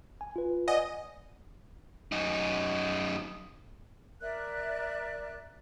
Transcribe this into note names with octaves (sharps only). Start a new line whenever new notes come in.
G#5
F4 B4
D5 D#5 F#5 G#5
F#2 D#4
A#4 D5 E5 F#6